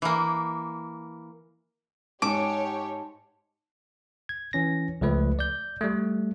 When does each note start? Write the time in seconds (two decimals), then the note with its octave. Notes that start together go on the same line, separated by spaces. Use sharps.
0.02 E3 A#3
2.22 G#2 G4 C#5 A5 D6
4.29 G#6
4.53 E3 C#4 A#6
5.01 C#2 F3 A3 B4
5.39 D5 G6
5.81 G3 A3